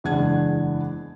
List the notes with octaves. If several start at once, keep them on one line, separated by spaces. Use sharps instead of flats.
F#1 E2 G#3 D4 F#5 G#6